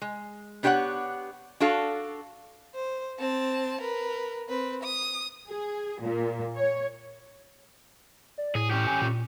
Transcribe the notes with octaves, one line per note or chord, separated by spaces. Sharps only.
G#3
B3 D4 G4 C5 C#5 F#5
D4 F#4 A4 F5
C5
C4 A5
A#4 B4
C4 B4
D#6
G#4
A#2
C#5
D5
A2 G#4
C#4 G4
G#5
A#2